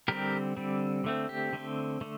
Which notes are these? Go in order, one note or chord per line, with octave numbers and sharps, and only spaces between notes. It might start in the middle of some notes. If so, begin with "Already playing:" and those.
D3 G3 C4 G4 A#4
D3 G3 C4
D3 A3 C4
G4
D3 A3 C4
D3 A3